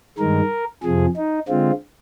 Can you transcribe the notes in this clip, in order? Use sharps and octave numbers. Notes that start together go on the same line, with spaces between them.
G2 D#3 G#3 A#4
F2 C3 F3 G#4
D#4
D3 G#3 C4 F4